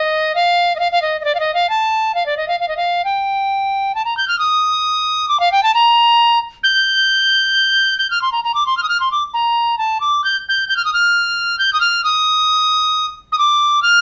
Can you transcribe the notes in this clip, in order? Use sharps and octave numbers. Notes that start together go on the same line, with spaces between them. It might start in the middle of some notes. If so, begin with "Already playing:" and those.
Already playing: D#5
F5
D#5
F5
F5
D#5
D#5
D5
F5
D#5
F5
A5
F5
D5
D#5
F5
F5
D#5
F5
G5
A5
A#5
G6
F6
D#6
D6
F5
G5
A5
A#5
G6
G6
F6
C6
A#5
A#5
D6
C6
F6
D#6
F6
C6
D6
A#5
A5
D6
G6
G6
G6
F6
D#6
F6
G6
D#6
F6
D#6
D#6
D6
F6